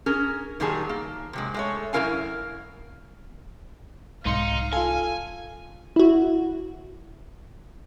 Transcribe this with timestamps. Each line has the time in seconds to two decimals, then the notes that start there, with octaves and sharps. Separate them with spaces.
0.06 C#4 G#4 A#4
0.60 A#2 D#3 F#3 G3 G#4 A5
0.89 A#3
1.33 C3 F#3 G#3
1.54 G#3 A3 C#5
1.93 F#2 G#3 E4 A#4 F5 G#5
4.26 C2 G#2 D#4 F5 C6 C#7
4.73 F4 A4 G#5
5.96 E4 F#4